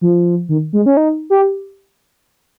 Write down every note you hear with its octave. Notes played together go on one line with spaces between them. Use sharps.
F3
D#3
G#3
C#4
D#4
G4